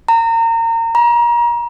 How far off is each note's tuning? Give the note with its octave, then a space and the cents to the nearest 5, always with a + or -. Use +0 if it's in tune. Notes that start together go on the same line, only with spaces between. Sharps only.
A#5 -30
A#5 +30